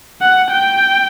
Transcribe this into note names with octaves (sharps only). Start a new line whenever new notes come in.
F#5
G5